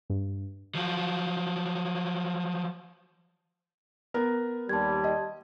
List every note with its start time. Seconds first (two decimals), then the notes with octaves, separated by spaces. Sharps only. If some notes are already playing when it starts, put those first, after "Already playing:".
0.10 G2
0.75 F3 F#3
4.14 B3 A#4
4.69 D#2 G3 A5 C6 G#6
5.04 D#5